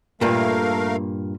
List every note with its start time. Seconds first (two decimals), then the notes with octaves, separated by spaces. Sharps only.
0.21 G2 A#2 A3 A#4 F5